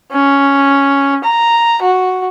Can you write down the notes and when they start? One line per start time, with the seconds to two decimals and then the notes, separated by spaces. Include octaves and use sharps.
0.12 C#4
1.24 A#5
1.82 F#4